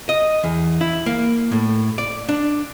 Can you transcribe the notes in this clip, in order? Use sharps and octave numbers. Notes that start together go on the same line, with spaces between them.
D#5
E2
E4
A#3
A2
D5
D4